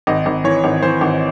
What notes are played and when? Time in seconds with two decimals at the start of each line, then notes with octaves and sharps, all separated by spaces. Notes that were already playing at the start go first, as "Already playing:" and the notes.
0.07 G#1 D#5
0.26 G#1
0.44 E3 C#5
0.64 G#1
0.82 E3 C5
1.01 G#1